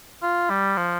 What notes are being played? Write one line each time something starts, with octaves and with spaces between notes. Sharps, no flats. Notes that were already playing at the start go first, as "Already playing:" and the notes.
F4
G3
F3